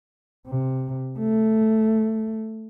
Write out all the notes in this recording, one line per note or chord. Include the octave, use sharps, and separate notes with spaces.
C3
A3